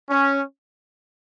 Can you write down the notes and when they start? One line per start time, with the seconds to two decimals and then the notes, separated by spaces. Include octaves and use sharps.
0.10 C#4